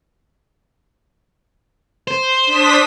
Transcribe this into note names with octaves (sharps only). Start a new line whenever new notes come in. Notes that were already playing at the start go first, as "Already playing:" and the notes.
C5
D4 D#6 B6